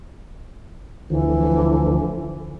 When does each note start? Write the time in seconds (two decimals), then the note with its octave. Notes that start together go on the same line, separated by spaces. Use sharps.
1.10 D2 D3 E3 F3